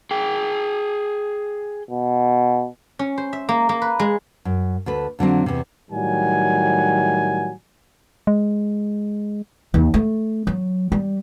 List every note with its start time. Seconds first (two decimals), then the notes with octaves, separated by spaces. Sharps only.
0.11 G#4 G5
1.91 B2
2.99 C#4
3.18 C5
3.33 E5
3.49 A#3
3.69 A#3
3.82 B4
3.99 G#3
4.45 F#2
4.86 D2 A4 B4
5.19 F2 D3 F#3 C4
5.46 E2 C3
5.91 A2 D#3 F#3 G3 F#5 G#5
8.27 G#3
9.74 D#2
9.94 A3
10.47 F#3
10.92 G3